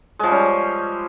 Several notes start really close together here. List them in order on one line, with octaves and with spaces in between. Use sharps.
G#3 F3 G3 C#4